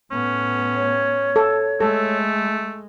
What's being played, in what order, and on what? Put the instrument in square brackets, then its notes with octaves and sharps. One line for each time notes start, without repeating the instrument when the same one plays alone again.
[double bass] A2 B3 [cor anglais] C#4
[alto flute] C#5
[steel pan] A4
[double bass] G#3 [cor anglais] A3 [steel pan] A4